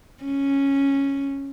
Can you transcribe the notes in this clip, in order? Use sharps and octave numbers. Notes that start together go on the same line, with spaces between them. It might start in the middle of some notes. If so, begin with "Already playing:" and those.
C#4